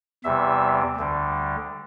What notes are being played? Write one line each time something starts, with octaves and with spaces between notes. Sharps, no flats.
E2 C3 G3 E5
D2 D3 G3